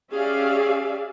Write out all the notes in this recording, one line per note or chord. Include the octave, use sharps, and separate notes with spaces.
C#4 G4 G#4 D5 E5 F5